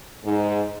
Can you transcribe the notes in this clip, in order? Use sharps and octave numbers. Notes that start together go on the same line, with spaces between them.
G#2